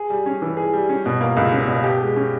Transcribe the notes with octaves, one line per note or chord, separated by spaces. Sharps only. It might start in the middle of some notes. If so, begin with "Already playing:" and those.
Already playing: G#4
G3
C#4
E3
G#4
G3
C#4
B2
A#3
C#2
C#4
B2
G4
G#3
C#4